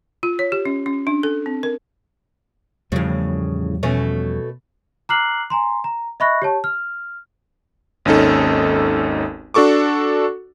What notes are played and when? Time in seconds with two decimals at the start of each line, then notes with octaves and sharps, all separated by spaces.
0.23 F4
0.39 C#5
0.52 G4
0.65 C#4
0.86 C#4
1.07 D4
1.23 A4
1.46 C4
1.63 A#4
2.92 E2 A2 C#3 F3 G3
3.83 B2 A3 C#4
5.09 A#5 D6 F6 F#6 C7 F#7
5.50 G#5 A#5 C6
5.84 A#5
6.20 D#5 E5 B5 C#6 F#6 A#6
6.42 G4 C#5 A5
6.64 F6
8.05 G#1 D#2 C#4 D#4 A4
9.54 D4 F#4 A4 C#6 D6